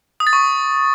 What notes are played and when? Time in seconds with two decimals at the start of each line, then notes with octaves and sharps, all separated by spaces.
0.20 D#6
0.27 A6
0.33 C#6